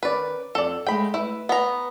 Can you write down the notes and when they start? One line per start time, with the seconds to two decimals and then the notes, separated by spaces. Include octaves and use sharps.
0.03 D#3 C#4 A#4 B4 D5
0.55 F2 A4 D5
0.87 G#3 A3 G#4 G5 B5
1.14 E4 B4
1.49 B3 A#5